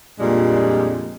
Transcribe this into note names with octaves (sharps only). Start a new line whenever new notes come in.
F2 A#2 G3 G#3 D4